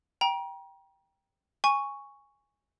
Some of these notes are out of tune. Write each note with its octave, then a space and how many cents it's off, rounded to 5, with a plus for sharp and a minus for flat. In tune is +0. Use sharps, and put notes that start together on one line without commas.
G5 +0 A#5 +35
G#5 -10 C#6 +0